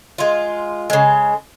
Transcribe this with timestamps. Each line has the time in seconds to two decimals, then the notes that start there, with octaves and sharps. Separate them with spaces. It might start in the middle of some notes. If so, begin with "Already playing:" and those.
0.18 G#3 F4
0.90 C#3 G#3